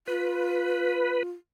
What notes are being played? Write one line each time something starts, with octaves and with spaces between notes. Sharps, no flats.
F4 B4